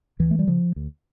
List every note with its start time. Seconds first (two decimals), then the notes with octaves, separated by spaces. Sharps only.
0.19 D2 E3
0.31 A3
0.39 G3
0.47 C#3 F3
0.76 D2